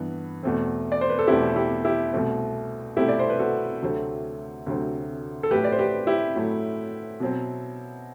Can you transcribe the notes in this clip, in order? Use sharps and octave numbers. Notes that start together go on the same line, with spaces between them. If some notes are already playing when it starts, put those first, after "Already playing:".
Already playing: G2 E3 B3
E2 B2 A3 C4
D5
C5
B4
A4
E2 B2 A3 C4 E4 G4
E4 G4
E4 G4
C2 B2 A3 C4
C2 B2 A3 C4 E4 G4
D5
C5
B4
F#4 A4
D2 C3 F#3 A3 C4
D2 C3 F#3 A3 C4
A4
A2 F#3 A3 G4 B4
D5
C5
G4 B4
E4 G4
A2 F#3 A3
B2 F#3 C4